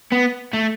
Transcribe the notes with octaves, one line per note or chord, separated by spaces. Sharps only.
B3
A3